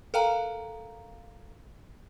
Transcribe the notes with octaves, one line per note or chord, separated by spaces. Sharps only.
A4 A#4 F5 G5 A#5